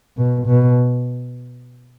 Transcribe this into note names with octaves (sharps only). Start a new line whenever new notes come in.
B2
B2